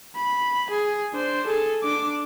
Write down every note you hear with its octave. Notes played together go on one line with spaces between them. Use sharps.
B5
G#4
D4 C5
G#4 A4
D4 D6